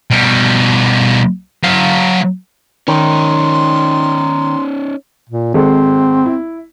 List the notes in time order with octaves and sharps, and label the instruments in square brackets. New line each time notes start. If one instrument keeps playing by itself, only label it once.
[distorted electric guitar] B2 G3
F#3 F5
[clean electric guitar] D#3 [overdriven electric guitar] C#4 D#4 [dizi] C6
[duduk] A#2
[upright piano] G#1 G#3 A4 [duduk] C4
[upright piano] E4